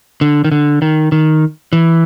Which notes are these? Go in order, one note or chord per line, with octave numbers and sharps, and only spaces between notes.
D3
D#3
D3
D#3
D#3
E3